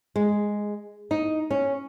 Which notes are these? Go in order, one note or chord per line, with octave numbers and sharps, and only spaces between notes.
G#3
D#4
C#4